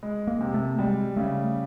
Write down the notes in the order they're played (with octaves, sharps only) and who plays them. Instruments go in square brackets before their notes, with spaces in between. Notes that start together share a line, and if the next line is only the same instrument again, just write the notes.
[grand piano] G#3
[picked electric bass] A#3
[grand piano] C3
[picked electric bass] A3
[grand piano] G3 [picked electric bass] G#3
[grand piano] C#3 [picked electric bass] A3